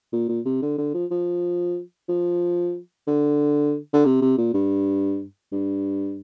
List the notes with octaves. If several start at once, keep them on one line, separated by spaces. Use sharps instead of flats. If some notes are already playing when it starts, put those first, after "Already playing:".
A#2
A#2
C3
D3
D3
F3
F3
F3
D3
D3
C3
C3
A#2
G2
G2